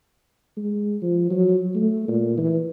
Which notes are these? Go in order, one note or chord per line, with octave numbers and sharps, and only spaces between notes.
G#3
F3
F#3
A3
A#2
E3